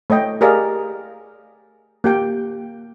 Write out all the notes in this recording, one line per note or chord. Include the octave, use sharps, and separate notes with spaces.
A3 C#5 D#5 G5
G4 G#4 A#4 D5 D#5 F5
A#3 G4 G5